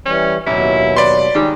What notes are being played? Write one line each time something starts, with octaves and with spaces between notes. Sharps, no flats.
E3 G3 C#4
A1 D#2 B2 F#3 E4
B4 D5 C6
D#3 G3 G#3